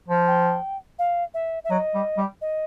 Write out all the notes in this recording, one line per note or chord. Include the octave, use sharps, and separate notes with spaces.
F3
G5
F5
E5
E5
F#3 D#5
G3
G3
D#5